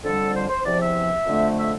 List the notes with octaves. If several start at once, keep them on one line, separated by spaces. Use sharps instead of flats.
F2 D3 G3 A4
C5
C5
E2 C3 F3 D5
E5
F2 D3 A3
E5